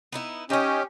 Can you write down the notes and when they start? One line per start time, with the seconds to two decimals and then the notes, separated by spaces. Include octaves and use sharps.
0.12 B3 D#4 E4
0.50 C#4 D#4 G4 D#5